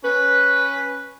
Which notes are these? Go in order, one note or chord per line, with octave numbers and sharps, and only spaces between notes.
C#4 B4